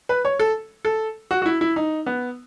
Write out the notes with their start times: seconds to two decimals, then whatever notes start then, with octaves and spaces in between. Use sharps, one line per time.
0.09 B4
0.25 C#5
0.39 A4
0.85 A4
1.31 F#4
1.42 F#4
1.46 E4
1.61 E4
1.76 D#4
2.06 B3